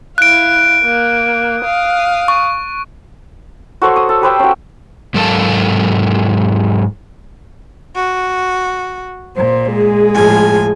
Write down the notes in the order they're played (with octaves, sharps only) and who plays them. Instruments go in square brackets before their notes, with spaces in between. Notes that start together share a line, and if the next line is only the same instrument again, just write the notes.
[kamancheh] E4 F5 [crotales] F#6 D7
[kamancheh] A#3
F5 D#6
[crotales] C#6
[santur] F#4 A4 C5 C#5
D#6
A4
G4 B4 C5 G5
C#4 F#4
[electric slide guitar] G#2 F#3 A4 A#4 F5 A5
[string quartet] F#4
[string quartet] A#2 [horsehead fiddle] C5
[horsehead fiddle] G#3 G#4
[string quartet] A2 F3 G#5